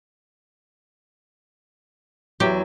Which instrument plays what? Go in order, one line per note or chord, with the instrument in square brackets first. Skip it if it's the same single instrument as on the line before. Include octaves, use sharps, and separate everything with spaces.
[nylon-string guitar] E2 F#3 [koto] G4